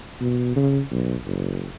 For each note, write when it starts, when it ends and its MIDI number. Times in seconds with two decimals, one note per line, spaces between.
0.21 0.53 47
0.56 0.81 49
0.91 1.15 35
1.25 1.67 30